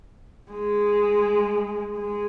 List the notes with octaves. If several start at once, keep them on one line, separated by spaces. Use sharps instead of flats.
G#3
G#3